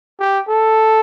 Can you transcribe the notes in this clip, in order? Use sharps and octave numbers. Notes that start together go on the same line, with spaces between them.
G4
A4